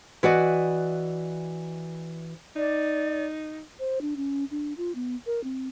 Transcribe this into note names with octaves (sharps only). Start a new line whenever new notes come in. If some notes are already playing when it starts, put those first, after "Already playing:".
E3 F#4 D5 D#5
D#4 D5
C5
D4
C#4
D4
F4
B3
A#4
C4